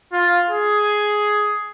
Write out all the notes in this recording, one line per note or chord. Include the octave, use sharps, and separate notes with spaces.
F4
G#4